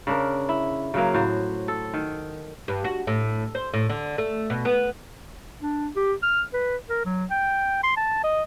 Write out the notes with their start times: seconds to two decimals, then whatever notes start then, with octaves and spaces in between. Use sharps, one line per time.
0.07 C#3 D4 A#4
0.49 E4
0.94 C#3 F#3 A#3
1.14 A2 F#4 C5
1.68 A4
1.94 D#3
2.68 G2
2.84 F#4
3.07 A2
3.55 C5
3.74 A2
3.90 D3
4.18 A3
4.50 B2
4.65 B3
5.61 D4
5.96 G4
6.23 F6
6.53 B4
6.89 A#4
7.05 F#3
7.31 G5
7.83 C6
7.97 A5
8.24 D#5